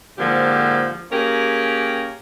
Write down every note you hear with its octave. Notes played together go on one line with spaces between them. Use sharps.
G#2 D3 F3 A#3 G4
A#3 C#4 G4 G#4 A#4